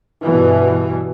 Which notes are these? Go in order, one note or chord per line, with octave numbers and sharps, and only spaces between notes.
G2 B2 E3